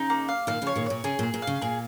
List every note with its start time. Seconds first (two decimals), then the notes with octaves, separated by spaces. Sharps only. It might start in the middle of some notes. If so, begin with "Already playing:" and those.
Already playing: C#3 D#4
0.10 A#3
0.29 F5
0.47 A#2 D#3 F5
0.62 C#3 F3 C#5
0.76 A#2 D#3
0.86 A#2 C#5
1.04 C#3 G#4
1.19 A#2 G#4
1.34 A#2
1.42 F5
1.47 C#3
1.62 A#2 G#4